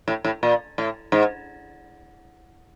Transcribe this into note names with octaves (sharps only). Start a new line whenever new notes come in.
A2
A2
A#2
A2
G#2